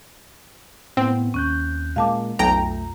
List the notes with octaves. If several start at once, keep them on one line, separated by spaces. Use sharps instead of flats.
A2 B3 C4
D#2 C#4 F#6 G6
A#2 G#3 A#3 F5 A5 D6
B1 F2 A3 G5 A#5